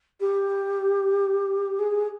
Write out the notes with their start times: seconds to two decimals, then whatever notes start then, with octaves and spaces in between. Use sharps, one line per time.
0.20 G4
1.79 G#4